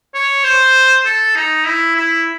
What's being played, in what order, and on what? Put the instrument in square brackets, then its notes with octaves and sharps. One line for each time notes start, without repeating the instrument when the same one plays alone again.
[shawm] C#5
C5
A4
D#4
E4
E4